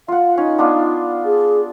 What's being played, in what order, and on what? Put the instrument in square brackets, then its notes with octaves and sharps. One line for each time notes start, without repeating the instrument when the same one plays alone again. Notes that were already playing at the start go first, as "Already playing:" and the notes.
[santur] F4 F#5 [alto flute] F5
[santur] C#4 [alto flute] D#4
[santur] B3 D4 F4
[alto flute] G#4